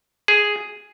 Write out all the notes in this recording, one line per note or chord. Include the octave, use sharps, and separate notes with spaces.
G#4